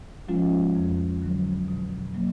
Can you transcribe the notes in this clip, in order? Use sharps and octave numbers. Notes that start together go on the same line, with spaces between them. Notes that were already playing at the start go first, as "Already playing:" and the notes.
F3 G#3 C#4 F4
F2
D3 F#3
B2
F#3 A#3